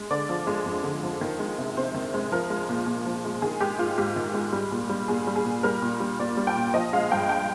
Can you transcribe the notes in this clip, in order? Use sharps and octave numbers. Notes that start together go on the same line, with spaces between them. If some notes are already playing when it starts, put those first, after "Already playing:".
Already playing: G#3
D3 D5
F3
G#3
F2
D3
F3
D#3
G#3
C3
C3 C5
D#3
G#3
F3 A#4
G#3
A#2
A#2
F3
G#3
D#3 G#4
G#3 G4
G#2 F4
G#2 G4
D#3
G#3
G3
A#2
G3
A#2 G#4
G3
G#4
A#2
G3 A#4
A#2
G3
A#2 D5
G3
G5
A#2
F3 D#5
G#3 F5
G2 G5
G5